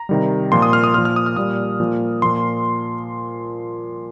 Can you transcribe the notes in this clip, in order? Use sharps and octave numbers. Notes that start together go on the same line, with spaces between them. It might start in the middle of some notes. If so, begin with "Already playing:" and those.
Already playing: A#5
C3 D#3 G3
A#2 F3 C6
D#6
F6
D#6
A#2 F3 F6
F6
D#6
F6
A#2 G3 D#6
A#2 F3
A#2 F3 C6